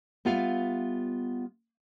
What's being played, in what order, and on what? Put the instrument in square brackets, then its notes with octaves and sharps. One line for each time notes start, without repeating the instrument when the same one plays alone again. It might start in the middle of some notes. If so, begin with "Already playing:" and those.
[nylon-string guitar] G3 B3 F4 E5 F5